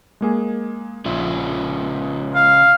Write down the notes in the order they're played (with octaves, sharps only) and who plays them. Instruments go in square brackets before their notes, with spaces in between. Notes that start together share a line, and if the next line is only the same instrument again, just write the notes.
[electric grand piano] G#3 A#3 G#4
[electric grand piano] A#1 [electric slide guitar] C#3 F4 E5
[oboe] F5